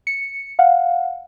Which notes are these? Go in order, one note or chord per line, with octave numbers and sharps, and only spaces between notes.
C#7
F5 F#5